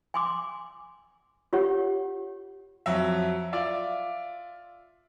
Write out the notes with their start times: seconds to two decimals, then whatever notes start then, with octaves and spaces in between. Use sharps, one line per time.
0.14 G#5 C6 D6
1.53 F4 G4 C#5 F#5
2.86 F2 F#3 E5
3.53 F4 D5 E5